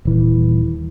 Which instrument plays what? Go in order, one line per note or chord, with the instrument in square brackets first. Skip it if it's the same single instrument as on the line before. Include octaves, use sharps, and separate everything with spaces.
[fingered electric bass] D#1 E3